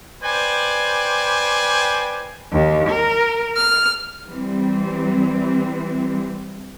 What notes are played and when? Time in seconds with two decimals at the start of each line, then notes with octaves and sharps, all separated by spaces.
0.23 B4 C5 D5 G5 G#5
2.53 D#2
2.89 A#4
3.55 F6
4.27 E3 G3 C4